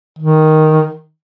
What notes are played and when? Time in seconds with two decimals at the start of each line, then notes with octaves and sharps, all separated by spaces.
0.19 D#3